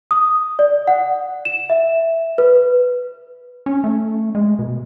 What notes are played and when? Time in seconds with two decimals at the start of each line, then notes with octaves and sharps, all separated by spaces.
0.11 D#6
0.59 D5
0.88 F#5
1.45 E7
1.70 E5
2.38 B4
3.66 C#4
3.84 A3
4.35 G#3
4.59 B2